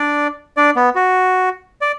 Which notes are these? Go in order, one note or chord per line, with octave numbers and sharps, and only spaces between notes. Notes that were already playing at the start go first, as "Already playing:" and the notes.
Already playing: D4 D5
D4 D5
B3
F#4
D5